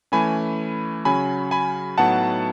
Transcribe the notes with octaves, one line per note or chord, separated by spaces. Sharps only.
E3 A3 C#4 G#5 B5
C#3 F#3 C#4 G#5 B5
G#5 B5
A2 F#3 B3 D#4 F#5 A5